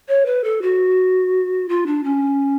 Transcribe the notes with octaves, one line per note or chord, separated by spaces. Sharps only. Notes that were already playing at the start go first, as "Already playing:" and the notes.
C#5
B4
A4
F#4
F4
D4
C#4